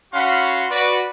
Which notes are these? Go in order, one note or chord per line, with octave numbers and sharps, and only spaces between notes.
C#4 F#4 F5 F#5 B5 C6
F#4 B4 D5